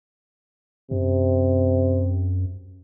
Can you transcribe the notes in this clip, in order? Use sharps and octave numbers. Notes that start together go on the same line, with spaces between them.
F#2 C3